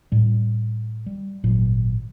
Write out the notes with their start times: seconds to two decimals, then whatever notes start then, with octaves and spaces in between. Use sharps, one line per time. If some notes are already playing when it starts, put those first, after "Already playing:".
0.12 A2 G3
1.06 G3
1.44 G#1 A#2 F#3